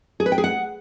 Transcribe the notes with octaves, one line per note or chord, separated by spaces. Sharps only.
G#4
B4
G5
G#4
F#5